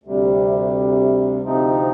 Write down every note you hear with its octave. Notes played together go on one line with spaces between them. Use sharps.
D2 C3 G3
D2 C3 F3 C4 D#4